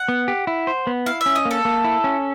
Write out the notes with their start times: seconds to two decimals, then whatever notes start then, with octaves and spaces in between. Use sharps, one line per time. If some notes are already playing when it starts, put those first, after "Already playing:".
Already playing: F#5
0.08 B3
0.28 G4
0.47 E4
0.67 C5
0.87 B3
1.06 E4 F5
1.21 E5
1.26 C#4
1.36 D#5
1.45 A#3
1.51 A4
1.65 A#3
1.84 E4
2.04 C#4